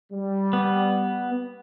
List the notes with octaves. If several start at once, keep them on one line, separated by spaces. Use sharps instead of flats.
G3
B3